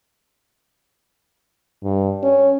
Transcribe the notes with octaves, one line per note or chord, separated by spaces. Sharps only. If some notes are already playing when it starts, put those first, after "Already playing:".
G2
C#4